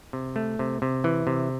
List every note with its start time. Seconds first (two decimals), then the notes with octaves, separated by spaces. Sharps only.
0.13 C3
0.36 A3
0.59 C3
0.82 C3
1.04 E3
1.27 C3